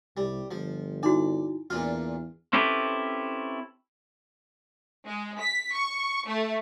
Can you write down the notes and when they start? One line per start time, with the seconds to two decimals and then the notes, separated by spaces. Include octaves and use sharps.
0.17 C2 G3
0.51 G1 F3
1.03 D#4 E4 F#4 D5
1.70 E2 A#2 D4 F4 F6
2.53 C4 C#4 E4 G4 A4 B4
5.07 G#3
5.39 B6
5.75 C#6
6.26 A3